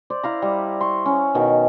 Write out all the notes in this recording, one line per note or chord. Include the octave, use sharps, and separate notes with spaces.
C5 D5
E4 F5 A#5
G3
C6 C#6
C#4
B2 D#3